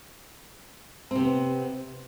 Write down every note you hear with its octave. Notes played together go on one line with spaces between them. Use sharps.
C3 B3 C4